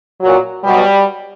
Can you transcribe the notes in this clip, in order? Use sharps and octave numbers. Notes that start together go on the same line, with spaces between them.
A#2 F#3
B2 F#3 G3